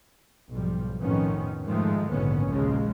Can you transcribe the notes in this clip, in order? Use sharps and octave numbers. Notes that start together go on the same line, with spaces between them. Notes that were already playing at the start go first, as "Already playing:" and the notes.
B1 G#2 F3 G3
F2 A2 D#3 B3 C#4
G#2 D#3 F3 G#3 A3
A#1 D#2 G#2 D3 B3 C#4
A#1 D#2 C#3 F3 G#3